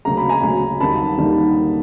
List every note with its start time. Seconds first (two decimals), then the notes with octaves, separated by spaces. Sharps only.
0.05 D2 C#3 F#3 A#3 A#5
0.17 B5
0.29 G#5 A#5
0.43 D2 C#3 F#3 A#3
0.80 D#2 D3 G3 A#3 D#4 A5 B5
1.17 D#2 D3 G3 A#3 D#4